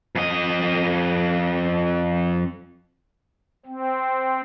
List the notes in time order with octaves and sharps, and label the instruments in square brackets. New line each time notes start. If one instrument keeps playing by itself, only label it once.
[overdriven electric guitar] F2 D#5
[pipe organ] C4